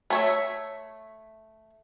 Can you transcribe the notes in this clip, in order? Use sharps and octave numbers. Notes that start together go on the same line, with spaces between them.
A3 C#5 E5